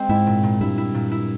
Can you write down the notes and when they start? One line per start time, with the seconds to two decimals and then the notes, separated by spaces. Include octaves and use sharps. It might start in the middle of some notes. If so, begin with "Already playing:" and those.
Already playing: G#3 C4
0.09 G#2 E4
0.27 A#2
0.43 A#2
0.61 G2 E4
0.78 E4
0.94 A#2
1.11 E4